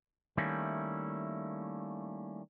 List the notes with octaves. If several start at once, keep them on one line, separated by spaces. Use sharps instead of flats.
D#3 G3 A3 A#3 C#4 E4